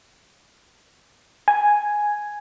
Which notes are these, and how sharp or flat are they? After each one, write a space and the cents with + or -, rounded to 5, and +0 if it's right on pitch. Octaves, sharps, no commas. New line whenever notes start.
G#5 +0